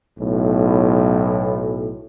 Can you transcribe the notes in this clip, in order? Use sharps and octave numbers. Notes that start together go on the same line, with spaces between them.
B1 A2